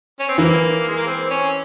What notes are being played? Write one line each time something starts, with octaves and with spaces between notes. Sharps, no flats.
C#4
C4
E3 A#3
G#3
A#3
C4
C#4